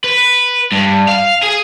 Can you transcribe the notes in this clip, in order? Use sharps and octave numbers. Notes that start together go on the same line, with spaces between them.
B4
G2
F5
G#4